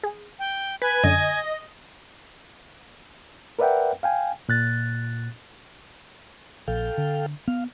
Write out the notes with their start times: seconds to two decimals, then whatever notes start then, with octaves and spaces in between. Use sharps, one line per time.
0.03 G#4
0.39 G5
0.82 B4 G#5
1.04 F#2 D3 D#5
3.59 A#4 B4 D5 E5 F#5 G5
4.03 F5 G5 G#5
4.49 A#2 F#6 A6
6.68 A#1 A4 F5 G5
6.98 D3
7.48 B3 F5